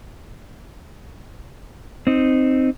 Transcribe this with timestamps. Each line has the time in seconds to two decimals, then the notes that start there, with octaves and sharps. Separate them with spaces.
2.07 C4 D#4